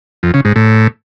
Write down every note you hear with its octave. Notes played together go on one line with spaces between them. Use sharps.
F2
C#3
G#2
A2